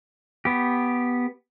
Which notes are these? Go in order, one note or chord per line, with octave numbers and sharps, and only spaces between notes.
B3 G4